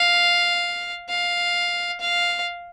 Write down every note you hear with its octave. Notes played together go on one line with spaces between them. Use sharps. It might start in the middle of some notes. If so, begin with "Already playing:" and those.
Already playing: F5
F5
F5